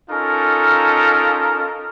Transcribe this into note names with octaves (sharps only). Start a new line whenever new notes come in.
C#4 D#4 F4 A4 A#4